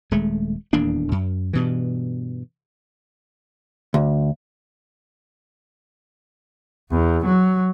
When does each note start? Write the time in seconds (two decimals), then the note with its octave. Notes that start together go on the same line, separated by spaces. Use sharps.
0.11 D#1 G#3 A3
0.73 D#1 E2 A#3 D4
1.12 F#2
1.53 G2 B2 E3
3.94 D2
6.91 E2
7.25 F#3